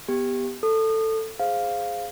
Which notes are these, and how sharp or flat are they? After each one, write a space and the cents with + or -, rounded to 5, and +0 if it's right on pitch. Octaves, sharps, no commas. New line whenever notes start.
B3 +0 G4 +10
A4 +10 D#6 -30
G#4 +0 C5 +0 F5 +0